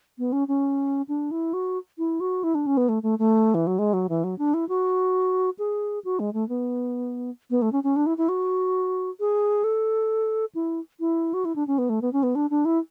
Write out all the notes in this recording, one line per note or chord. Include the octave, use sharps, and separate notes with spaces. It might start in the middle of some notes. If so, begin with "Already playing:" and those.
B3
C#4
C#4
D4
E4
F#4
E4
F#4
E4
D4
C#4
B3
A3
A3
A3
E3
F#3
G#3
F#3
E3
F#3
D4
E4
F#4
G#4
F#4
G#3
A3
B3
B3
A3
C#4
C#4
D4
E4
E4
F#4
G#4
A4
E4
E4
F#4
E4
D4
C#4
B3
A3
B3
C#4
B3
D4
D4
E4